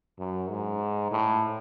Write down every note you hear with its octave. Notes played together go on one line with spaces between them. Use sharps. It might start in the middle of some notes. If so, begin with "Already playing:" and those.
F#2
G#2
A2